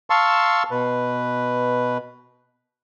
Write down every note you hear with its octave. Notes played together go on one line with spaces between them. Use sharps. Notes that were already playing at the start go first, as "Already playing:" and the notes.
F5 A5 C6 C#6 E6
B2 B4